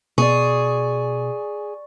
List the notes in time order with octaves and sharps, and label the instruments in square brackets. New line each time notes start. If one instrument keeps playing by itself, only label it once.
[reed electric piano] B2 [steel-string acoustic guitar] G#4 [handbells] D5 C#6